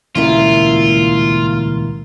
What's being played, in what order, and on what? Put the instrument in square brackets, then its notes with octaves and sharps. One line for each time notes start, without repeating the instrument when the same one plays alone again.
[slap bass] D#1 C#2 C#4 [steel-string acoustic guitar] A#3 E4 E5 [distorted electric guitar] F4